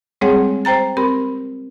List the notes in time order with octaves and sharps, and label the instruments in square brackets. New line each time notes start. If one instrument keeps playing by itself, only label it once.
[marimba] G3 G#3 C4 G#4 C#5 F#5
C5 G5 A#5 A6
C4 G4 A#4 B5